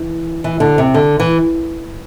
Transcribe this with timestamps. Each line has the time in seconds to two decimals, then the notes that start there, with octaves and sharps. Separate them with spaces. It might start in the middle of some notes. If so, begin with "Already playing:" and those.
Already playing: E3
0.44 E3
0.60 D3
0.78 C3
0.94 D3
1.20 E3